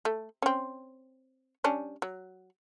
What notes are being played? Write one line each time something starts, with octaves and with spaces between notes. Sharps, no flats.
A3
C4 C#4
G3 C#4 D4
F#3